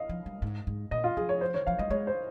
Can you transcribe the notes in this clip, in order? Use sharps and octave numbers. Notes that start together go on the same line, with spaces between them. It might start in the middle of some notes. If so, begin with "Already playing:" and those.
Already playing: D#5 F5
F3
G3
G#2
G#2
A#2 D#5
F4
F3 G#4
C#5
C5
D#3 C#5
F3 F5
G3 D#5
G#3 C#5
C5